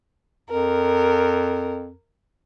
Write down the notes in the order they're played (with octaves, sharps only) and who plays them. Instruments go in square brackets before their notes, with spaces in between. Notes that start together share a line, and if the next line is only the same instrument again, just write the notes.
[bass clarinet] F2 [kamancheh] A#4